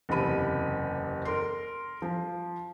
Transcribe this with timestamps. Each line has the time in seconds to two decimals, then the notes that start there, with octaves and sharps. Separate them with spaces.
0.09 F#1 E2 C3 B5 D#7
1.25 A#4 C6
2.02 F3